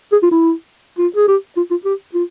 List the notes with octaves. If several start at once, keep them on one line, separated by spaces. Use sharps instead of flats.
G#4
F4
E4
F4
G#4
G4
F4
F4
G4
F4